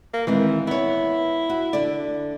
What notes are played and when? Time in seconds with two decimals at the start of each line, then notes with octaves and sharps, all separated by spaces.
0.14 A#3
0.27 D#3 E3 G#3 C4
0.67 B3 E4 C#5
1.50 F#4
1.73 D3 D5